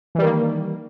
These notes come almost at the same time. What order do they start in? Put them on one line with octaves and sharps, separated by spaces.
E3 G3 D#3 A#3